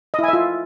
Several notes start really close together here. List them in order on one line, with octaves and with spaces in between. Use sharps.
D#5 E4 G#5 E5 F4